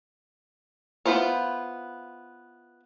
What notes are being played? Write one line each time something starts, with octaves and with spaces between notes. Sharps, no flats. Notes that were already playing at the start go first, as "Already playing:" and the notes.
B3 E4 F4 C5 C#5